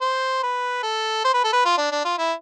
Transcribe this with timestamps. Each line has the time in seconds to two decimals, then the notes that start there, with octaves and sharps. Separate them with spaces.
0.01 C5
0.43 B4
0.83 A4
1.25 C5
1.34 B4
1.44 A4
1.53 B4
1.65 F4
1.78 D4
1.92 D4
2.05 F4
2.18 E4